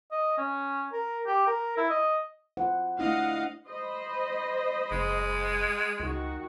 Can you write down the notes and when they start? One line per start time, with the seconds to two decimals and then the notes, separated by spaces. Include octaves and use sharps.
0.12 D#5
0.38 C#4
0.93 A#4
1.27 G4
1.47 A#4
1.77 E4
1.90 D#5
2.57 F4 C5 F#5
2.99 A3 D4 E4 D#5 F5 F#5
3.68 C5 D#5 B5
4.91 F#1 G#3
6.00 C#2 D#3 F#4